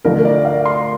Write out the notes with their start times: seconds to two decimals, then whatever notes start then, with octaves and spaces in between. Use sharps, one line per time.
0.05 D2 D3 F3 A#4
0.25 D5
0.45 F5
0.65 C6